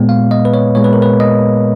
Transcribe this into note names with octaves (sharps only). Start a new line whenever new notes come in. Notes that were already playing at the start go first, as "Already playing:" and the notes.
Already playing: A#2 G#3 B3
F5
D#5
B4
C#5
A#2 G#3 B3 C#5
B4
A#4
B4
D#5